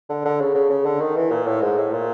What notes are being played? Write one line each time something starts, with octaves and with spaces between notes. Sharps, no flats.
D3
D3
C#3
C#3
C#3
D3
D#3
E3
A#2
A2
G#2
A2
A#2